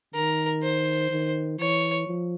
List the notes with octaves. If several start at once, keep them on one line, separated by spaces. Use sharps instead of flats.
D#3 A#4
C5
D#3
E3 C#5
F3